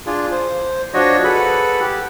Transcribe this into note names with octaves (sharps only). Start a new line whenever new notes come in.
D4 F4 G#4
C5
F3 D4 F#4 C#5 D#5
G#4 A4 B4 F#5 B5
G4